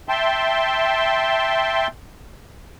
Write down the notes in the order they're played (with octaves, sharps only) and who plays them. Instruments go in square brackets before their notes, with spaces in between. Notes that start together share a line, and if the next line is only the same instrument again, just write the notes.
[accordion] E5 G5 A5 C6